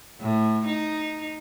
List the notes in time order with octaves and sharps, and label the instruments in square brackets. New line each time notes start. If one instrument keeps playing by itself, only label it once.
[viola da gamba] A2
D#4